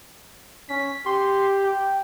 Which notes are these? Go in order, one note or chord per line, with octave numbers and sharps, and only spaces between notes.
C#4 B6
G4 C6
G5